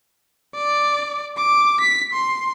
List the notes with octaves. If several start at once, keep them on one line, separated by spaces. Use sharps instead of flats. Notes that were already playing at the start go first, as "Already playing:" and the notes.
D5
D6
B6
C6